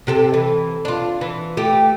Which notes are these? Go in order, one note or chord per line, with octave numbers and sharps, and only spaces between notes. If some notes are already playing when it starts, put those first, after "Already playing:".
C3 G4 A4
E3
D4 F4
E3
A3 G4